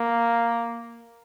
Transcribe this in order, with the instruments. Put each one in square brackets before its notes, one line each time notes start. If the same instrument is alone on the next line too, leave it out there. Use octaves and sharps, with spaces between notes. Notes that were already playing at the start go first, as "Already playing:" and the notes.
Already playing: [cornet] A#3